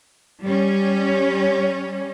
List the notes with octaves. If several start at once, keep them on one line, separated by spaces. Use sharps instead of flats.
G3 C#4